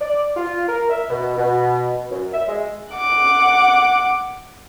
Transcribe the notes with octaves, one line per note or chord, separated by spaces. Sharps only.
D5
F4
A#4
E5
B2
B2
F#2
E5
G#3
F#5 D6